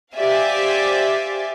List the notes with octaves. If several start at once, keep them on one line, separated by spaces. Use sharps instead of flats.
G4 C5 D5 E5 F5 G#5